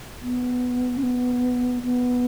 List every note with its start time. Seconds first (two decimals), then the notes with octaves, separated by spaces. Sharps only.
0.22 B3
0.97 C#4
1.03 B3
1.83 B3